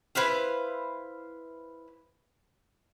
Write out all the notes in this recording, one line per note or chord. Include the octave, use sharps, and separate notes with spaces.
E4 B4 C5 F5